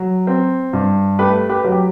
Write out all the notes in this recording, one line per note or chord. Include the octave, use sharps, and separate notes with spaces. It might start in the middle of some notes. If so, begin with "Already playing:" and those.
Already playing: F#3
C4
G2
A3 G4 B4
G4 B4
F#3
G4